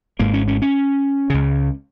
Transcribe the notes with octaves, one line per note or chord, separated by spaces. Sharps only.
G#1 G#2 A#3
C#4
C#4
C#4
C#2 C#3